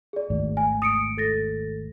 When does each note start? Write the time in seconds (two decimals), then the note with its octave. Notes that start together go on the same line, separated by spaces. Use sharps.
0.13 G#4 D5
0.30 G#1 D#2 A2
0.57 G#5
0.82 D#6 C#7 D7
1.17 A4 A6 A#6